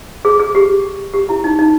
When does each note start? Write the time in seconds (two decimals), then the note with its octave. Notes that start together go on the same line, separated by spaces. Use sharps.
0.25 G#4
0.40 G#4
0.55 G4
1.14 G4
1.29 E4
1.44 D#4
1.59 D#4